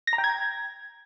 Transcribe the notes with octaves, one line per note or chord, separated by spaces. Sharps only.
A#6
A#5
G5
G#6